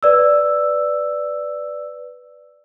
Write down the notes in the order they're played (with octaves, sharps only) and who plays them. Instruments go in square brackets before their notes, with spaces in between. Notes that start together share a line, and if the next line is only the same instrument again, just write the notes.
[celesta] B4 D5 E6